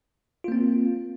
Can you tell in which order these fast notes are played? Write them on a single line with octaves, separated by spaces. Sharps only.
F4 A#3 C4